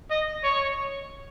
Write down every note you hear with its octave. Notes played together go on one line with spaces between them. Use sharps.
D#5
C#5